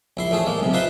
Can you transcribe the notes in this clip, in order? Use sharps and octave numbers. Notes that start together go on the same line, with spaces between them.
A#1 E4 C6
A1 A3 G#4 A4
G#3 A#3
B1 C3
D#4 F4 B4 E5 C6